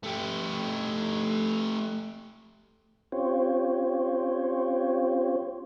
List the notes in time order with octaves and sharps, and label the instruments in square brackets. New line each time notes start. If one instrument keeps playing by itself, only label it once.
[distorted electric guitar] A3 G4
[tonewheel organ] C4 C#4 F4 G4 C5 C#5